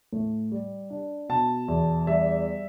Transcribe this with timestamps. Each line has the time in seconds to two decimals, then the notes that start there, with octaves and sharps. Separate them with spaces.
0.13 A2
0.52 G3
0.90 D4
1.29 B2 A5
1.68 E2
2.07 G3 E5